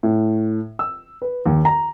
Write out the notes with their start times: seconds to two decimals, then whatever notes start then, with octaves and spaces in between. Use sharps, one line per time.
0.03 A2
0.79 E6
1.22 B4
1.46 D#2
1.65 A#5